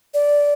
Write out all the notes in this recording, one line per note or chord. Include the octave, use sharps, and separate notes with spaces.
D5